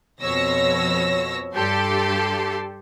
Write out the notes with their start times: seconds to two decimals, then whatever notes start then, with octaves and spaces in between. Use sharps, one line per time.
0.22 F2 B2 C#5 E6 A#6
1.55 G2 G4 A4 A5 C6